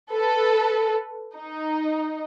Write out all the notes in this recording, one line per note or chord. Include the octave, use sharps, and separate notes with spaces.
A4 B4
D#4